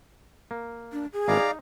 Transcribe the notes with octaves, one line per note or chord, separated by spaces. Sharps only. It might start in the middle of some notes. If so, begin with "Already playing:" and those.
A#3
D4
G#4
G#1 E3 D4 D5 F5 A#5
D#4